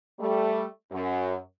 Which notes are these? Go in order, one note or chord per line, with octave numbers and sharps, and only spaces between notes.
G3 A3
F#2